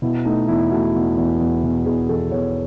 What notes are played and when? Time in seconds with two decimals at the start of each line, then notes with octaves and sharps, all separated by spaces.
0.02 B2 E4
0.25 A3 D#4
0.48 E2 E4
0.71 A3 F#4
0.94 E2
1.18 E2
1.41 E2
1.63 B2
1.86 E2 G#4
2.09 E2 A4
2.32 E2 C#5